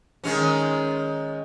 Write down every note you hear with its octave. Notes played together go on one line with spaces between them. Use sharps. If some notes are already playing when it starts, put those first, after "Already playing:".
D#3 G#3 C#4